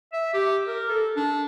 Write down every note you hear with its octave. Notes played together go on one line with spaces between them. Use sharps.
E5
G4
A#4
A4
D4